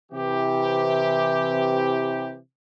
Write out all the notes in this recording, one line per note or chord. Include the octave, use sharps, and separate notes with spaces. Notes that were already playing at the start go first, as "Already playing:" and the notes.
C3 E3 G4